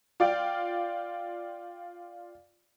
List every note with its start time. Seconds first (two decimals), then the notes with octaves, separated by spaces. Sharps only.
0.20 F4 D5 F5 G5